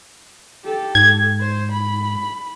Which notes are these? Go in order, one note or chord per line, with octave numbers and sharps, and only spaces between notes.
G4 A4
G#2 G#6
C5
B5